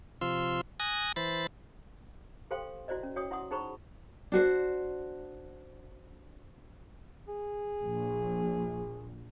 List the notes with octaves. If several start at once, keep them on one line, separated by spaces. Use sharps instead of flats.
C3 F3 F4 C6 E6
G#5 D#6 F#6 A#6
E3 C5 B5 A6
G4 A4 C5 F5 G5 C6
E4 F#4 C5 D5 D#5
C#4
F#4 C#5 G5 D#6
E4 F#5 C6 D#6
D#4 G#4 C5 A#5 B5 C#6
D4 F#4 C5
G#4
A#1